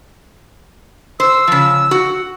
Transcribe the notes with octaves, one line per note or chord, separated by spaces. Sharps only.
C5 E6
C#3 F3
F#4